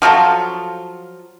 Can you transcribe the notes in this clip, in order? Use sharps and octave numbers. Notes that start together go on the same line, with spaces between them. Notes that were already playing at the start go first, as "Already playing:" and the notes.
F3 F#3 F4 A4